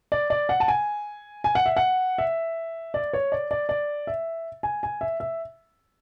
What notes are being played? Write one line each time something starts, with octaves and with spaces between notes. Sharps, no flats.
D5
D5
F#5
A5
G#5
G#5
F#5
E5
F#5
E5
D5
C#5
D5
D5
D5
E5
G#5
G#5
E5
E5